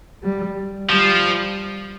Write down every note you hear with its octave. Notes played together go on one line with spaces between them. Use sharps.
G3
F3 G3